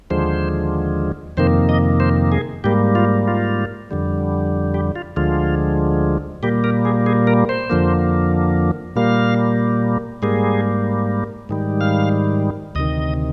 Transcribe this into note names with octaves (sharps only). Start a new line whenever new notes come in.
D#2 D3 F3 G#3 C5
F2 C3 D#3 A#3 C5
D#5
C5
G#4
G#2 G3 A#3 G4
F4
F4
F2 D3 G3
G4
F4
D2 D3 F3 G#3 F4
A#2 G3 A#3 G4
A#4
G#4
G#4
A#4
C5
F2 D3 F3 A#3
A#2 G3 A#3 F5
G#2 G3 A#3 G#4
G#2 D#3 G3
F5
D2 C3 D#3 D#5